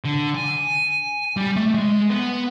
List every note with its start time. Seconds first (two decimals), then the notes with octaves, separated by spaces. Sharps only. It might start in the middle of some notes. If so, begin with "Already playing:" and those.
0.05 D3
0.35 G#5
1.37 G3
1.56 A3
1.75 G#3
2.10 B3